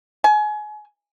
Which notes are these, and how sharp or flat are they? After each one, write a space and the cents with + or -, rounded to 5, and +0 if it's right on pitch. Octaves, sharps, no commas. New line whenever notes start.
G#5 +30